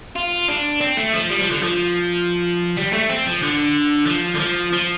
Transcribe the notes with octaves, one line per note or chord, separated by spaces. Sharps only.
F4
D4
C4
A3
F3
G3
F3
D3
F3
G3
A3
C4
F3
D3
F3
D3
F3
F3